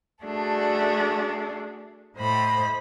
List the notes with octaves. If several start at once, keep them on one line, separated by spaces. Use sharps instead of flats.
A3 D4 F#4 G#4 A4
A2 C5 D#5 B5